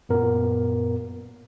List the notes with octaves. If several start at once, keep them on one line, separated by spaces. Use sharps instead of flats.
F#2 A#2 B3 A#4